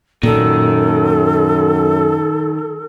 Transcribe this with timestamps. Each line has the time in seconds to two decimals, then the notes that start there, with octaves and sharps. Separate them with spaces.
0.23 F#2 A#2 D#3 A4